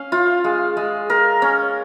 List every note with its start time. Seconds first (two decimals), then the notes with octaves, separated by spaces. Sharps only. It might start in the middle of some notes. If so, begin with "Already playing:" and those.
Already playing: C#4 F5
0.12 F4
0.44 G#3
0.77 G#3
1.10 A#4
1.42 C#4